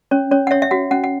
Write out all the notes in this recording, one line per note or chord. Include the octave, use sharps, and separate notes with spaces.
C#4 C#5
C#4 C#5
F#5
C#5 E5
E5
F#4 F#5
C#4 F#5
F#5